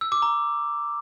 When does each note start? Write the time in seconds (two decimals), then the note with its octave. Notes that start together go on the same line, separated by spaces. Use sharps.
0.01 E6
0.12 D6
0.22 A#5